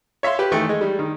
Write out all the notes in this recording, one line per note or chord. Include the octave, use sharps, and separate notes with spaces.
C#5 E5 F5 C6
G4 B4
D#3 E3 A3 G5
G#3
G3
D#3